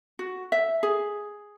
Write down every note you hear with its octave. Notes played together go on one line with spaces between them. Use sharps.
F#4
E5
G#4